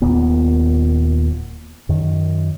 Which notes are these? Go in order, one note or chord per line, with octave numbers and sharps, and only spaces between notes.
D#1 D#2 A#2 B3
F#2 D#3